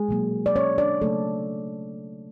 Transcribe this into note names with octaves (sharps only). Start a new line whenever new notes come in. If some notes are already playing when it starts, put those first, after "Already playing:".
Already playing: G#3 G#4
B2 F#3 A#3
D5
C#4 C#5
D4 D5
C#3 F#3 A3 A#3 A4